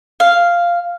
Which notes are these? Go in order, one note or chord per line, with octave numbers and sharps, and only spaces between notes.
F5